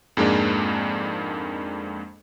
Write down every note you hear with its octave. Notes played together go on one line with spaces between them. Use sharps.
F2 G#2 G#3 A#3 D4